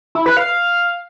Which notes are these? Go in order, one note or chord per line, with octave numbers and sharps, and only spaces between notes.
E4
B4
F5